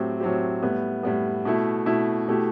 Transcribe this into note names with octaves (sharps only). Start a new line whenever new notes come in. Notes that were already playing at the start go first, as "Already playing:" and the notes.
Already playing: A2 F#3 C4 G4
A2 F#3 C4 G4
A2 G3 B3
A2 G3 B3
B2 A3 E4
B2 A3 E4
B2 A3 E4 G4